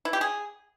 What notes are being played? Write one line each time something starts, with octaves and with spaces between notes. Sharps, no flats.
E4
G4
G#4